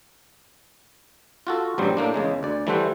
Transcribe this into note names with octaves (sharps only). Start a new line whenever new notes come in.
F4 F#4 A4
A1 G2 F#3 G3 C5
A2 A#3 D4
E2 C#3 G#3
D2 D5
E3 G3 A3 A4 C5 F#5